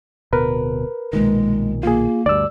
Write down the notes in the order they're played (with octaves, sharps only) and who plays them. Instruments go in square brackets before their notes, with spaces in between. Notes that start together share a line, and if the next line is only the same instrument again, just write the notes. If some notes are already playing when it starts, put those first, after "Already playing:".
[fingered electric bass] D1 B2 [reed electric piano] A#4 B4
[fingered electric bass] B1 A#2 D#3 [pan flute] G#3
[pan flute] A#3 [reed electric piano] F4 G#4
[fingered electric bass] D2 G2 [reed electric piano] D5 E6